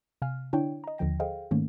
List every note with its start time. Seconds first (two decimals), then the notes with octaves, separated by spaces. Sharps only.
0.22 C3 F5 G#5 F6
0.53 D3 D4 E4 C#5 G5
0.84 D#5 A#5
0.98 D#2 D3 F3 G5 A#6
1.20 G#4 A4 C5 D#5 F5 G5
1.51 G#2 D#3 A3 A#3 C#4